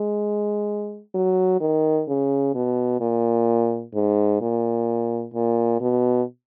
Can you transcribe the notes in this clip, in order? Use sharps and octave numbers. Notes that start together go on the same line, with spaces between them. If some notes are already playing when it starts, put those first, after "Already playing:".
Already playing: G#3
F#3
D#3
C#3
B2
A#2
G#2
A#2
A#2
B2